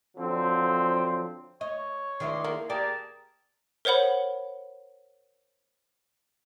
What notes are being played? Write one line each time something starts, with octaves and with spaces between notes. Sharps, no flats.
D3 F3 F#3 C4
C#5 D#5
C#2 D#3 D#4 E4 D5 C6
A#3
G4 G#4 A#4 D5 A5
A#4 C5 C#5 F#5 B5